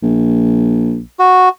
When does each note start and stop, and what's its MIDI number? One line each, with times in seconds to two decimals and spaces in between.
0.03 1.01 34
1.19 1.49 66